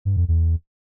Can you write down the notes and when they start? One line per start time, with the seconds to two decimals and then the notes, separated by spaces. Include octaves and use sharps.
0.05 G2
0.17 F2
0.28 E2